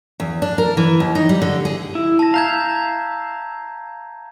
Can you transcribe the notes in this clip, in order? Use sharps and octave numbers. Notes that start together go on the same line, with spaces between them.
E2
D4
A#4
E3
D#2
D#4
G3
D3
G#4
E4
A5 A#6
E5 F5 A#5 G6 G#6